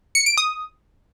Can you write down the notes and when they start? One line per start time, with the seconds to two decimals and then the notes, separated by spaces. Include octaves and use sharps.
0.15 C#7
0.26 D7
0.38 D#6